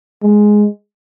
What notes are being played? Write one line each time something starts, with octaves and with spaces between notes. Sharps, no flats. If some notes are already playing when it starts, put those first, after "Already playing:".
G#3